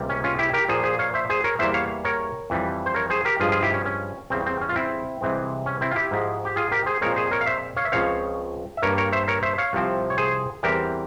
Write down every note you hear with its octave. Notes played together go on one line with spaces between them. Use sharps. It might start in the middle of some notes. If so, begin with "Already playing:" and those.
Already playing: C#2 C3 G3 A#3
C#4
C#4 F4
E4 G4
G4 A#4
A#2 F3 A#3 G#4 C5
G#4 C5
C#5 F5
C5 E5
G#4 C5
A#4 C#5
E2 E3 G3 A#3 C5 E5
C#5 F5
A#4 C#5
F2 E3 G3
C5
A#4 C#5
G#4 C5
G4 A#4
G2 F3 G#3 F4 G#4
F4 G#4
E4 G4
C#4
C#4
E2 C#3 G3 C4
C4
C#4
F4
C4 E4
C2 C3 E3 G#3 C4
C#4
C4 E4
F4
E4 G4
G#2 F3 G#3
G4
F4 G#4
G4 A#4
G#4 C5
A#2 F3 G#3 C4 A#4 C#5
G#4 C5
A#4 C#5
F5
C5 E5
C#5 F5
E5
C#2 C#3 F3 C4 C#5 F5
E5
G2 G3 A#3 A#4 C#5
A#4 C#5
C5 E5
A#4 C#5
C5 E5
C#5 F5
C2 C3 F3 C4
C#5
G#4 C5
E2 E3 G3 C4 G4 A#4